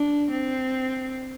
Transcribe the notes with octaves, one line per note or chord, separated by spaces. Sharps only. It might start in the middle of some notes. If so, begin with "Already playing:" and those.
Already playing: D4
C4